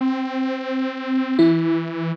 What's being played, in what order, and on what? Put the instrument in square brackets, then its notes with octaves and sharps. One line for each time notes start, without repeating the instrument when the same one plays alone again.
[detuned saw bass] C4
[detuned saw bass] E3 [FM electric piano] E4